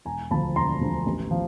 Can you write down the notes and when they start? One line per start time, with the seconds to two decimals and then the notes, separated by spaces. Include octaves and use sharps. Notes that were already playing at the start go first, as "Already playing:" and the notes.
0.05 E1 G#5 A#5
0.31 D2 D3 F3 A5 B5
0.56 E1 A#5 C6
0.81 D2 D3 F3
1.06 A1
1.31 F3